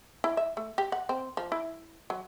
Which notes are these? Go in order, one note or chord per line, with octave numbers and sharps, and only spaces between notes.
E4
E5
A3
G4
F#5
C4
F3
E4
F#3